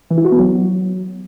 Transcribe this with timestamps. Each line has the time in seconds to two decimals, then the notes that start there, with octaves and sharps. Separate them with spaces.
0.10 E3
0.18 E4
0.25 F#4
0.32 B3
0.39 F#3